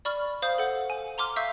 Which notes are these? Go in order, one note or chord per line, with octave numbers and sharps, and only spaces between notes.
D5 B5 C#6 F6
C5 F5 D#6 G6
A4 F#5
G#5
A#5 C6 D6 F6
E5 F5 C#6 E6 G6